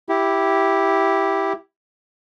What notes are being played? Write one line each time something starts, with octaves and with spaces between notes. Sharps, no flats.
E4 G4